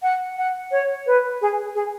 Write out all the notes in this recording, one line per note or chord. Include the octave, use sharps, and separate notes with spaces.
F#5
F#5
C#5
B4
G#4
G#4